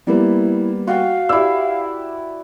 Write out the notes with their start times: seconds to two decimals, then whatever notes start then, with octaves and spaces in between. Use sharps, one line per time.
0.07 G3 A#3 B3 E4
0.87 F#4 F5 G5
1.29 E4 G4 D5 E6